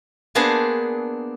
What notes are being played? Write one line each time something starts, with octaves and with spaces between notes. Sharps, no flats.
A#3 B3 D4 G#4 C5